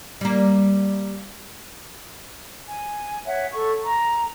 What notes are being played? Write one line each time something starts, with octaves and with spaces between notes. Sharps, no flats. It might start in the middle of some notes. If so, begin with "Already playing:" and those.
G3 A#3
G#5
C#5 E5 F#5
A4 C#6
A#5